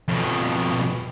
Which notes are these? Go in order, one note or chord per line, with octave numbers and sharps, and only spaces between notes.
F2 B2